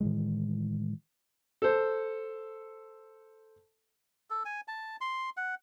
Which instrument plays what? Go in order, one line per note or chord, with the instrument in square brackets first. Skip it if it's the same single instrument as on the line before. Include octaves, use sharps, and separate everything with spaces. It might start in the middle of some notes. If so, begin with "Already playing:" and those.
[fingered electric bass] A2 D#3 E3 G#3
[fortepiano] A4 C5
[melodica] A4
G#5
A5
C6
F#5